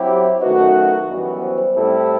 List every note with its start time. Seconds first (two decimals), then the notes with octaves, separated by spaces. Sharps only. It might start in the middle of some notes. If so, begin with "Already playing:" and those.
Already playing: F#3 C4 E4 G4 C5 E5
0.41 F#2 D#3 A3 D#4 F#4 B4 D#5
1.08 F#2 E3 G3 B3 F#4
1.42 C5
1.58 C5
1.74 A2 G3 C4 E4 A4 C5